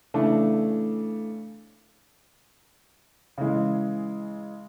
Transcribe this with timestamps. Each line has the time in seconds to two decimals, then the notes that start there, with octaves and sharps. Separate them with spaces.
0.14 C#3 E3 A3 D4
3.38 C#3 E3 G#3